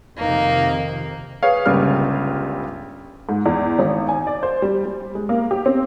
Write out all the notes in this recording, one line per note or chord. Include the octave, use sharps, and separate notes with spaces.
F2 C3 D#3 A#3 D#4
G#4 B4 C#5 F5
G1 C#2 A#2 C#3 G3 F6
G#2
E2
G#1
G#5
D5
C5
G3
G3
G#3
A#3
G4
C4